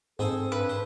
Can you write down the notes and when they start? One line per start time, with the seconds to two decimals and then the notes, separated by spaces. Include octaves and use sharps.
0.19 G#2 C4 G#4 A4 C5
0.52 G2 B4
0.69 C5